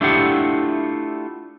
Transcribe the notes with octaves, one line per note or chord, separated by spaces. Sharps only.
A3 D4 E4 F4 G4 F#5